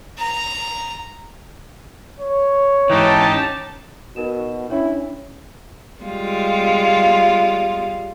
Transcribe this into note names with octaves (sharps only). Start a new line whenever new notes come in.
A#5
C#5
G#2 E3 C#4 D#4 G4 A5
B2 D#4 F#4 A#4 E7
C#4 D4 E4 C#5
G3 G#3 F4